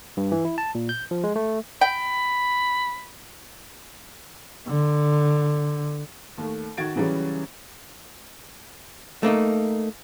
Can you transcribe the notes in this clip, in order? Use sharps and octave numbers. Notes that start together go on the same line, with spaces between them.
G2
E3
E4
A5
A#2
G6
F3
G#3
A3
G5 B5
D3
D#2 A3
D#3 F#4 G#6 A6 D7
C#3 E3 F#3 G3 C#4
A3 A#3 D4 D#4